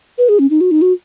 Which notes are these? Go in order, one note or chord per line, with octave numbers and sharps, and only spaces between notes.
B4
G#4
C#4
D#4
F#4
D#4
F#4